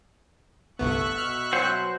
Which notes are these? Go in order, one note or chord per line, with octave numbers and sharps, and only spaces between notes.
G1 C2 A3 B3 E5 C#6 F#6
B2 F6
F#3 C5 F#5